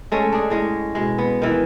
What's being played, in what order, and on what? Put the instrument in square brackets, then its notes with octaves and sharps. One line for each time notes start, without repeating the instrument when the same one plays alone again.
[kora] G#3 A3 C#4
D4 G#4
A2 G#3 C#4
B2 G#3
B3
D#3 E3